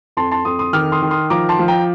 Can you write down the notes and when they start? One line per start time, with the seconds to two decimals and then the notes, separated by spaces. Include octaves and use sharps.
0.17 F2 A5 C6
0.31 A5 C6
0.45 F2 C6 D#6
0.59 C6 D#6
0.73 D#3 D6 F6
0.92 C6 D#6
1.02 D#3
1.11 C6 D#6
1.30 F3 A#5 D6
1.49 A5 C6
1.59 F3
1.68 G5 A#5